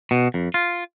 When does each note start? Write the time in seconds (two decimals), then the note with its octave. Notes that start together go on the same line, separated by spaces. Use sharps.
0.11 B2
0.34 F2
0.54 F4